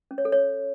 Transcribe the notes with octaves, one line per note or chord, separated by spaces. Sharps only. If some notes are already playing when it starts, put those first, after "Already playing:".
C#4
C#5
A4
C#5